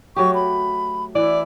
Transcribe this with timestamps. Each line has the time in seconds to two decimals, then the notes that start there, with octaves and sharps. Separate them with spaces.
0.16 F#3 A3 G4 C#6
0.34 B5
1.15 E3 E4 D5